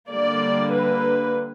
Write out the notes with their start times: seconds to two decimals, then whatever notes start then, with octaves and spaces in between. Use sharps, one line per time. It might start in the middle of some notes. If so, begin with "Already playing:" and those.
0.12 D3 G3 A#3 D5
0.72 B4